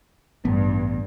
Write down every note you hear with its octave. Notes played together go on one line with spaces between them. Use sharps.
A1 G2 B3